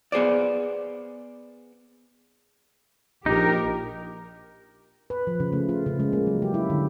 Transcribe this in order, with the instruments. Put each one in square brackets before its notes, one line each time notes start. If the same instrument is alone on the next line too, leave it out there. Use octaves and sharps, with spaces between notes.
[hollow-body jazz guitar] B3 G#4 C5 D5
[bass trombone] A#1 [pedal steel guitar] D#4 [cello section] G4 A#4
[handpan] B4
F3
C#3
A3
F4
C#3
G#3
A#3
F#3
G4
E4
D3